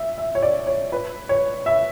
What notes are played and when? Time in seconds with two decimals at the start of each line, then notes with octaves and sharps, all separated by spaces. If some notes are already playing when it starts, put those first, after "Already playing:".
Already playing: E5
0.18 E5
0.35 C#5
0.43 D5
0.67 C#5
0.92 B4
1.29 C#5
1.66 E5